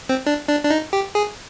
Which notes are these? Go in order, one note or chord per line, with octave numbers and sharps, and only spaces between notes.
C4
D4
D4
D4
D#4
G4
G#4